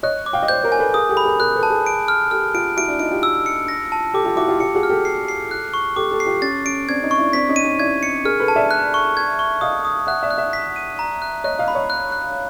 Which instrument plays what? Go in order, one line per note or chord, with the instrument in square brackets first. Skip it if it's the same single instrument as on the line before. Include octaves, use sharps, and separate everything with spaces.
[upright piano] C#5 D#5 [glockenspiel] F#6
[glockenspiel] D6
[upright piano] F5 G5
D#5
[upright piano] C5 D5 [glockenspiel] G6
[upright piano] A#4 C5
[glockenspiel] G#5
[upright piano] A4 B4
[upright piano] G#4 A#4 [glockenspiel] D#6
[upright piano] G4 A4
[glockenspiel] B5
[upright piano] G#4 A#4
[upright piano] G#4 A#4 [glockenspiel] F#6
[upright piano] A4 B4
[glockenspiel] A5
[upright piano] G#4 A#4
[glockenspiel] D7
F6
[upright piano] G4 A4 [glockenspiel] F6
[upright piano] F4 G4 [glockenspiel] D7
[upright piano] E4 F#4 [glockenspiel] D7
[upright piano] D4 E4
[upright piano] D#4 F4 [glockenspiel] D7
[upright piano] F4 G4
[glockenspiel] E6
C#7
A#6
A5
[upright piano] G4 A4 [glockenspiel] D6
[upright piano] F4 G4
[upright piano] E4 F#4 [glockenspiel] D6
[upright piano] F4 G4
[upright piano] F4 G4 [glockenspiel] C#7
[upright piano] F#4 G#4
[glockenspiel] F6
[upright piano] G4 A4
[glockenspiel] C7
C7
F#6
C#6
[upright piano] G4 A4 [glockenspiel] D6
[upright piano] G4 A4
[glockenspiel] C7
[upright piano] F4 G4
[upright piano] C#4 [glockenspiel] A6
[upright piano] C#4 [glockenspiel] D7
[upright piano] C4 D4 [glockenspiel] G#6
[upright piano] C#4 D#4
[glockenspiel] C#6
[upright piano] D4 E4
[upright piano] C4 D4 [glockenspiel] B6
[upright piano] C#4 D#4
[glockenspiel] D#7
[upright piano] C#4 D#4
[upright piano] D4 E4 [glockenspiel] G#6
[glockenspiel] C#7
[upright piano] G#4 A#4 [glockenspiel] F6
[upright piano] A4 B4
[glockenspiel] A5
[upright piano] D5 E5
[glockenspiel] F#6
C#6
G#6
C#6
[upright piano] D#5 F5 [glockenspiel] D#6
[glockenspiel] D#6
[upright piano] E5 F#5 [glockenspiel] F#6
[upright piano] D5 E5
[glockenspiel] F#6
[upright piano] D5 E5
[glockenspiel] B6
D#7
A#5
F#6
[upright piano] C#5 D#5 [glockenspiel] F#6
[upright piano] D#5 F5
[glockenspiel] B5
[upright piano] C#5 D#5
[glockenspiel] F#6
F#6